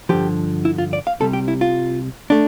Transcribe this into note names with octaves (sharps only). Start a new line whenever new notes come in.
G2 D3 F3 G4
E4
F4
D5
F5
C2 C3 G3 A4
G4
E4
F4
A3 D4